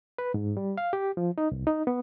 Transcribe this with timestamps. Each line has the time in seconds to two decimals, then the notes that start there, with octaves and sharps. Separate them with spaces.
0.18 B4
0.34 G#2
0.57 G3
0.78 F5
0.93 G4
1.17 F3
1.38 D#4
1.52 C2
1.67 D#4
1.87 B3